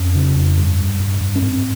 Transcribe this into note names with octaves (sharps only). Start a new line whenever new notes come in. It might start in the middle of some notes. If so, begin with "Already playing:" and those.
Already playing: F2 C#4
C#3
F2
G2
G2
G2
G2
C#4
G#2 C4